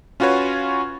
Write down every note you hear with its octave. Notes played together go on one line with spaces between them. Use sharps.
C#4 F4 F#4 B4 C#5